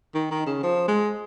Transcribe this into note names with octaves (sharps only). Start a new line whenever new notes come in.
D#3
D#3
C#3
F3
G#3